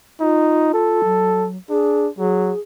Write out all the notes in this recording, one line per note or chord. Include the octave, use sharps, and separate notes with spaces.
D#4 F4
A4
F#3
D4 G#4
F#3 G#4